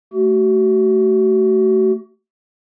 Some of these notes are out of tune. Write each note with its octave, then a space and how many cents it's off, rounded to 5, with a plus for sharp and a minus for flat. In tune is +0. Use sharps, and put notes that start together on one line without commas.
A3 +5 F#4 +35